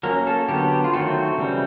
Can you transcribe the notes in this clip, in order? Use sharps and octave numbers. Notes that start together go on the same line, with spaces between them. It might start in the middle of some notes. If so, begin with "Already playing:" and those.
F#3 A#3 C#4 A#4
A4
D3 F#3 B3 G4
F4
D#3 F#3 A3 C4 F#4
C#3 E3 G3 C4